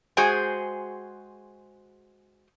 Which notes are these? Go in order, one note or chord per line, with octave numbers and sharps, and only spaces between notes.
G#3 F#4 G#4 C5 G5 G#5